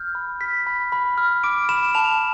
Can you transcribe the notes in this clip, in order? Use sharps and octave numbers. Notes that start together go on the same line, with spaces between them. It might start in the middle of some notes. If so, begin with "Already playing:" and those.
Already playing: F6 G6
B5
F6 B6
B5
B5
F6
D6 D7
B5 E7
E7
A5 F7